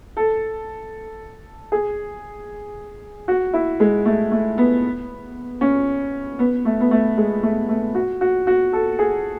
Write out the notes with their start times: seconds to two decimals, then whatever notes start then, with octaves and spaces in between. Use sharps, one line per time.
0.17 A4
1.72 G#4
3.28 F#4
3.53 E4
3.80 G#3
4.06 A3
4.32 A3
4.58 B3
5.61 C#4
6.39 B3
6.65 A3
6.80 B3
6.91 A3
7.17 G#3
7.43 A3
7.69 A3
7.95 F#4
8.21 F#4
8.47 F#4
8.73 A4
8.99 G#4